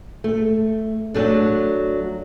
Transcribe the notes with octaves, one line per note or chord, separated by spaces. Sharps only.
A3
F#3 A3 D4